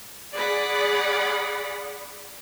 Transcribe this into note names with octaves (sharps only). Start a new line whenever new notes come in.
G#4 D5 F#5 B5